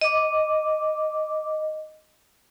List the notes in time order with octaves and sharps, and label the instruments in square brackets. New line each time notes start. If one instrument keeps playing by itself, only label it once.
[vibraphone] D#5 D6